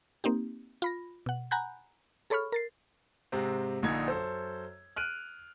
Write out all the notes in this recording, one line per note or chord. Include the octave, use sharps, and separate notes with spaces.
A#3 C4 D#4 G4
F4 B5 A#6
B2 F#5
F#5 G#5 A#5 B5 F#6 G6
G#4 A4 C#5 B5 C#6 F6
A#4 A6 C7
G#2 C3 C4
A#1 A#2 D3 D#4 G#6
F#2 A4 C5
F6 F#6 D7 D#7